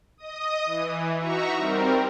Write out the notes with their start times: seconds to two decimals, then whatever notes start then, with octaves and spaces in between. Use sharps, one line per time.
0.17 D#5 D#6
0.66 E3
1.18 D#4 F#4 E5 A#5 C#6
1.57 G3 C4 A#4